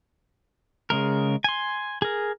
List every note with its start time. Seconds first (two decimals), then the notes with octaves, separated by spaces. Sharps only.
0.90 C#3 G#3 A#4
1.44 G#5 C6
2.02 G#4 A#4